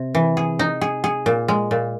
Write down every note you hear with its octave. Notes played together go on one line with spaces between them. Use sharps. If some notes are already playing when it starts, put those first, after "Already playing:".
Already playing: C3
E3
G#4
D#4
G#4
G#4
A#2
G#3
A#2